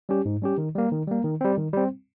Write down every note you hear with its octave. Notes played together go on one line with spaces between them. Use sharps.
G3 C#4 G4
G#2
G3 C#4 G4
D#3
G3 A#3
D#3
G3 A#3
D#3
G3 C4
D#3
G3 C4